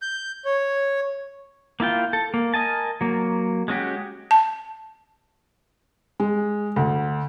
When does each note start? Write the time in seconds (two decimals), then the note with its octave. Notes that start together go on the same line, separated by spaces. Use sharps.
0.02 G6
0.45 C#5
1.80 A#3 E4 F4 G5
2.13 A4
2.34 A#3
2.54 A#4 D#5 G#5 A5
3.01 F#3 A#3
3.68 G#3 C#4 F#4 G4
4.31 A5
6.20 G#3
6.76 D2